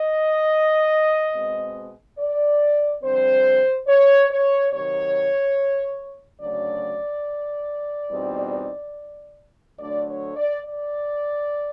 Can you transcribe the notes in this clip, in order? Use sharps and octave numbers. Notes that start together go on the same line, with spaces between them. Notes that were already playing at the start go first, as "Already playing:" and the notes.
Already playing: D#5
B2 G#3 C4
D5
F2 D3 G3 C4 C5
C#5
C#5
C3 D#3 F#3 C#5
D2 C#3 F#3 A3 D4 D5
E2 B2 G3 C4 D#4
D2 D3 F#3 A3 D4 D5
C#5
D5
D5